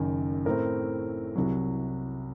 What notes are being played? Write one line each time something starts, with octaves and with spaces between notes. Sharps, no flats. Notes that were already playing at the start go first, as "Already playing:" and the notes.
Already playing: F#1 F#2 D#3
A2 A3 C4 A#4
C2 C3 F#3